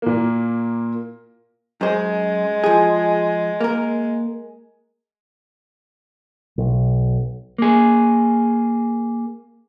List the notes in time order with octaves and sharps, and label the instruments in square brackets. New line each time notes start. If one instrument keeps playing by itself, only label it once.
[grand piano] A#2 A#3
[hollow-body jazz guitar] F#2 C5 [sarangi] G#3
[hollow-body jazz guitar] F3 G#4
A#3 A#4
[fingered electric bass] B1
[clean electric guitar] A#3 G#4